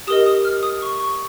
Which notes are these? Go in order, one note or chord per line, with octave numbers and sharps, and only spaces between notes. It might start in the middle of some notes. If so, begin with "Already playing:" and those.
G4 A#4 D#5 D#6
D#6
F6
D#6
C#6
C#6